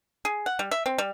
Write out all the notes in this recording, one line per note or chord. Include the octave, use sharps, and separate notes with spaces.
G#4
F#5
G3
E5
C4
G3